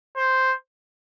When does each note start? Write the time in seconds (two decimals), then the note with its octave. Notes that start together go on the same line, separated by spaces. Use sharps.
0.17 C5